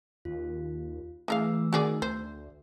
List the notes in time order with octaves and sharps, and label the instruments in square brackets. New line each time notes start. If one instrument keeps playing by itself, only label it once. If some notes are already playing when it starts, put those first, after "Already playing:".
[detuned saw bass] D#2 [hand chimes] F4
[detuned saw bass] E3 [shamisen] G#3 A#4 F5 [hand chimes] A3 E6
[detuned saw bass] D#3 [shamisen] F#4 G#4 D5
[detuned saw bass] D2 [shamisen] C5